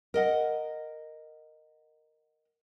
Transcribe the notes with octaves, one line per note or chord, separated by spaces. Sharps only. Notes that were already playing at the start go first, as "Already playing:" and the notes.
A#4 D#5 F#5